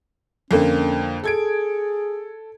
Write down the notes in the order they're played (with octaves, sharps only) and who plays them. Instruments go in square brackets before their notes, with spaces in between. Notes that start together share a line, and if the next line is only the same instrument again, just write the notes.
[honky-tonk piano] F2 D3 A#3 [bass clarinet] C#4
[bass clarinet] G#4 [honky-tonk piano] A4 G#6 D7